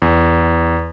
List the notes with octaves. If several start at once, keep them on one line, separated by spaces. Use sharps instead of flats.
E2